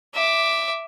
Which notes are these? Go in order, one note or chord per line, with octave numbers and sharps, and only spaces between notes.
E5 D6